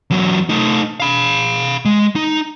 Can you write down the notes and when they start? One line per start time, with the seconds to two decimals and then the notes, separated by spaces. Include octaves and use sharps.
0.11 E2 F#3
0.49 A3 D#4
1.00 F5 B5
1.85 G#3
2.16 D#4